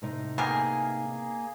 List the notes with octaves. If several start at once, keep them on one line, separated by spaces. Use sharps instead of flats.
A2 C3 D#4
B2 A#3 G4 G#4 A#4 G#5